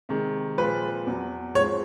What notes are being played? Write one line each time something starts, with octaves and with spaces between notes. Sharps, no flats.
C3 D#3 G#3
A#2 F3 G#3 C4 B4
E2 B2 F#3
G#2 F3 G#3 C4 C#5